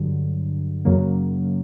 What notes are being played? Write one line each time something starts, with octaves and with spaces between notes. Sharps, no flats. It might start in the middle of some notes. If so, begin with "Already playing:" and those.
Already playing: G2 D3 F#3
F#2 C#3 F#3 A#3